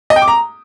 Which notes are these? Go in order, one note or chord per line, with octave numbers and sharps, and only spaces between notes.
D#5
G5
D6
A#5